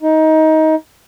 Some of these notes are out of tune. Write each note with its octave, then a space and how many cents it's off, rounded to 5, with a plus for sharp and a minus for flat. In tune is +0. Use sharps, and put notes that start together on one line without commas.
D#4 +20